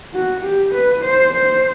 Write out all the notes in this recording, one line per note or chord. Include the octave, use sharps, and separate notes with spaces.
F#4
G4
B4
C5
C5